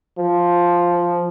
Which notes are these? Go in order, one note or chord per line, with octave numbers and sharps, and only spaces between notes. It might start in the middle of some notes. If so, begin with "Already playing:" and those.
F3